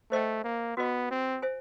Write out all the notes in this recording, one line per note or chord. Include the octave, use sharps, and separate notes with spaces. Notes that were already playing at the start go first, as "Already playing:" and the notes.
A3 C5 D#5 G5
A#3
B3 F#4 B4 D#5
C4
C5 E5 G#5